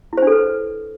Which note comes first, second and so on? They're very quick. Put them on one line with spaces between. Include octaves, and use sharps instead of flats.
E4 C5 D4 A4 B4